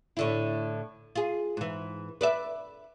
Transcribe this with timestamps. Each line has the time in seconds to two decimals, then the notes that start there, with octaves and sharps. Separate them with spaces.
0.17 A2 D3 E4
1.16 F4 G#4
1.57 G#2 E3
2.21 B4 D5 E5